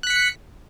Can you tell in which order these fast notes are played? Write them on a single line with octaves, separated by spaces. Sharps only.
F#6 B6 C#7